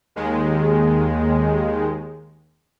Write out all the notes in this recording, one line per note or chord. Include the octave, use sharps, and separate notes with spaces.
D#2 D#3 G#3